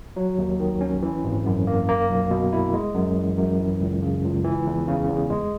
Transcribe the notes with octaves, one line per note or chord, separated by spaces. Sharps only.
F#3
D#2
D#3
C#4
E3
G#1
F#2
A#3
A#3
B1
B2
E4
G#3
F#2
E3
F#2
E3
C#2
C#3
C#2
E3
E2
C#3
E2
G#3